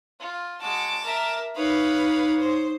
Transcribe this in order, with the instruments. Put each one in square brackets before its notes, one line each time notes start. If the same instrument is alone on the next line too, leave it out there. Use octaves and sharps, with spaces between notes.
[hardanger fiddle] F4
[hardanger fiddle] G#3 F#4 [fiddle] A5 D6
[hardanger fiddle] A#4 E5
[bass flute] D#4 [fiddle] B4 F5 [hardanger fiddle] C#5 D#6
[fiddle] C5